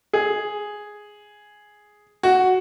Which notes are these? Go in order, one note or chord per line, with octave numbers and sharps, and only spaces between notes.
G#4
F#4